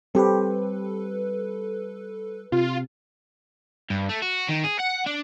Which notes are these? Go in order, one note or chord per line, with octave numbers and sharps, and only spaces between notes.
G3 C4 G4 A4 B4
C3 F4
G2
A3
F#4
D#3
G#4
F#5
D4